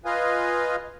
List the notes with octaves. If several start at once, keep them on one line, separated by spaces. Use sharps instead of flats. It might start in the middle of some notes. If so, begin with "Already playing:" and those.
F4 B4 D#5 F5 G#5